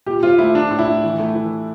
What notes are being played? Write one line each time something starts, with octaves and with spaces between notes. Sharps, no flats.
A#2 G4
C4 F4
A3 E4
F3 D4
A2
E4
A2
E3
A3
E3